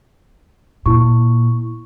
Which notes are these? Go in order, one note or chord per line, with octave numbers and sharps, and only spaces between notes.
A#2 E4 C#6